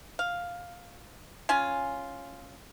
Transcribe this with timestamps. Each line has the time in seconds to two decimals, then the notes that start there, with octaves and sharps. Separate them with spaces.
0.19 F5
1.49 C#4 F4 G#5